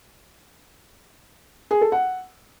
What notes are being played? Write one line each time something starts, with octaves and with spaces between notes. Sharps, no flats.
G#4
A4
F#5